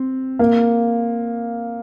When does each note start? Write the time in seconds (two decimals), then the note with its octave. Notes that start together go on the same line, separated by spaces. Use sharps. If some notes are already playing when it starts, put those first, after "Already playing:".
Already playing: C4
0.39 A#3